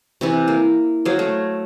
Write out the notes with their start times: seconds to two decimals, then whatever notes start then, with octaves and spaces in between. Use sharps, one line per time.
0.21 C3 E3 E4
0.48 A#3
1.05 F#3 C5 C#5 F5
1.19 A3